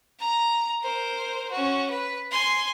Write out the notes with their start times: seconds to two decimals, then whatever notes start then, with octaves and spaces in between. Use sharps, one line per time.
0.19 A#5
0.82 A#4 C5
1.51 C#4 F#4
1.90 B4
2.31 G#5 C6